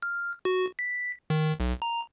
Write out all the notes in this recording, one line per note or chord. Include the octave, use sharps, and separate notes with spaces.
F6
F#4
B6
D#3
B1
A#5